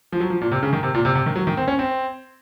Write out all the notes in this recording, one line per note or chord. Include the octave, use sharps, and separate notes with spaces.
F3
F#3
F3
A#2
C3
C#3
D#3
C3
A#2
C3
C3
D#3
F#3
D#3
C4
C#4
C4